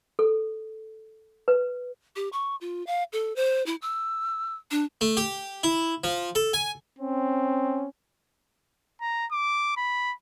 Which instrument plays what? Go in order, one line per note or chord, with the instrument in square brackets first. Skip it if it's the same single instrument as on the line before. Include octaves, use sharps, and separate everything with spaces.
[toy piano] A4
B4
[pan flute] G4
C#6
F4
F5
A4
C5
E4
E6
D4
[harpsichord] A3
G4
E4
F3
A4
G#5
[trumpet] C4 [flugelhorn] C#4
[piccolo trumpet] A#5
D6
B5